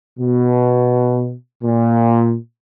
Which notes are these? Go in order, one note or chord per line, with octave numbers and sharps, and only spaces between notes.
B2
A#2